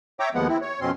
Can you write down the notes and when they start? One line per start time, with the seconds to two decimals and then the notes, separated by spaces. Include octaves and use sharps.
0.20 C#5 E5 G5 A#5 D6
0.35 D#2 F3 G#3 B3 F#5
0.48 C4 E4
0.62 C#5
0.81 F2 B2 C4 C#4 C6